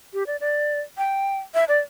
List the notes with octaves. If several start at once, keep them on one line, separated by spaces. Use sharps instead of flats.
G4
D5
D5
G5
E5
D5